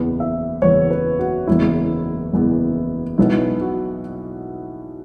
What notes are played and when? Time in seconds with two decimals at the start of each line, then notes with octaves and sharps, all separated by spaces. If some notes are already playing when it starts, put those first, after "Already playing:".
Already playing: F#1 E2 E3 B3
0.20 E5
0.62 F#1 E2 E3 B3 C#5
0.91 B4
1.19 F#4
1.47 F#1 E2 E3 B3 E4
2.33 F#1 E2 E3 B3
3.18 B1 B2 F#3 B3 E4
3.61 F#4